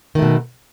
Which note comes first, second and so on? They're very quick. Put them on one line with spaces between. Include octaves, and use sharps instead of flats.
D#3 A3 B2